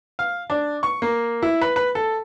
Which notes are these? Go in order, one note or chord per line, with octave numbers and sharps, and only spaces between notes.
F5
D4
C#6
A#3
E4
B4
B4
A4